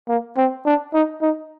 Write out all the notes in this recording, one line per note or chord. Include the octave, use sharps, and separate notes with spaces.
A#3
C4
D4
D#4
D#4